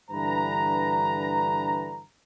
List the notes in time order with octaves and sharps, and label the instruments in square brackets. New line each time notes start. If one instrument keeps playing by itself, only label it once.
[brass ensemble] G2 D3 E3 B4 A#5